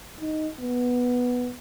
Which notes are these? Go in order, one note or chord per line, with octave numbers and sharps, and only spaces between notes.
D#4
B3